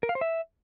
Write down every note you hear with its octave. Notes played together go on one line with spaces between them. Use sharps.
A#4
F5
C5
E5